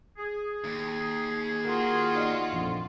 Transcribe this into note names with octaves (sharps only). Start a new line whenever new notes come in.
G#4
D#2
F4 F#4 A#4
D#4 D5 D#5
A#1 F2